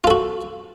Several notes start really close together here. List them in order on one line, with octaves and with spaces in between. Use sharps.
F4 A4 F#4